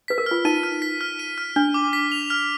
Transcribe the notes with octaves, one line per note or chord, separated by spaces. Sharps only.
B4 B6
A#4
F4 F6
D#4 D#7
F6
B6
F6
D#7
F6
D4 F6
D6
B6
F7
F6